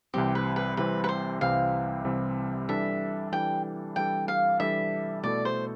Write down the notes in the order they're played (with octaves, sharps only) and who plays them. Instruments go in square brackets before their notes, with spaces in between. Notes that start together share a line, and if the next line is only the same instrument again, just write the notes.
[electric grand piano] C2 C3 E3 G3 C4 [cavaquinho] G4
[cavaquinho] B4
B4
[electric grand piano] C2 C3 E3 G3 C4 [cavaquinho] B4
[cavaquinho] B4
C5
[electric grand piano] C2 C3 E3 G3 C4 [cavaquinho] F5
[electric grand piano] C2 C3 E3 G3 C4
[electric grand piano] E3 G3 D4 A4 [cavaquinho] E5
[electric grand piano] E3 G3 D4 A4 [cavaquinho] G5
[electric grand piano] E3 G3 D4 A4 [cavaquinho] G5
[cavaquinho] F5
[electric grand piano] E3 G3 D4 A4 [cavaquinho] E5
[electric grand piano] B2 A3 E4 A4 [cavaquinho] D5
[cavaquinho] C5